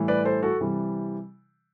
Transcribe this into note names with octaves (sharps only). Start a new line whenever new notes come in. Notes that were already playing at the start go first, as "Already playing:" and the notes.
Already playing: A2 E3 G3
B4 D5
A4 C5
F#4 A4
C3 E3 G3